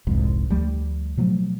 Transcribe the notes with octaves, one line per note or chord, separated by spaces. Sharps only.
F1 C2 F2 G#2
D2 F3 G3 A3
B2 F3 F#3 A3